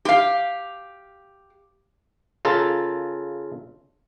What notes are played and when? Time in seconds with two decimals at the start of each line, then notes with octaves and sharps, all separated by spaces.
0.05 G4 F5
2.45 C#3 F4 A4 A#4